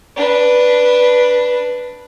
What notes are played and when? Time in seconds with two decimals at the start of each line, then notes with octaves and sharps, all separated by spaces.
0.17 D4 B4